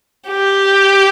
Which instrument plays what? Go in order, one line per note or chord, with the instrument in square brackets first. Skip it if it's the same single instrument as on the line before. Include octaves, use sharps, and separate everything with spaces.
[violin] G4